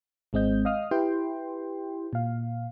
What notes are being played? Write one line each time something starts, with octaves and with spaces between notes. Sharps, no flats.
G#1 G#3 C4 D#5 G6
D#5 F5 D#6 F6
E4 G4 B4 G5 C6
A#2 F5